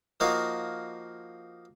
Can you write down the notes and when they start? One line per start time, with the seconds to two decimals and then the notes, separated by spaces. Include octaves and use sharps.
0.20 F3 A#3 D#4 F#4 A#4 F5